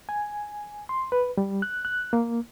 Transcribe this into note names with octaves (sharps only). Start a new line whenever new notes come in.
G#5
C6
B4
G3
F#6
F#6
A#3